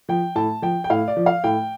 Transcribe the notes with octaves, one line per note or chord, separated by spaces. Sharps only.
F3 G5
A2 A5
F3 G5
G5
A2 F5
D5
F3
F5
A2 G5